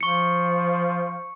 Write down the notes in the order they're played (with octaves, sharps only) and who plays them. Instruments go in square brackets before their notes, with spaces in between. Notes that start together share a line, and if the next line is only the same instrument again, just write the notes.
[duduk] F3 [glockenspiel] C#6 C#7